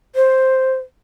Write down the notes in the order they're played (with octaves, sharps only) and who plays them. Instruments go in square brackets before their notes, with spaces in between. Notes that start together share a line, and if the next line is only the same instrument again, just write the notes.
[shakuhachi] C5